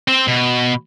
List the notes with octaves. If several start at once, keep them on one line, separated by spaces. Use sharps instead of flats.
C4 C5
B2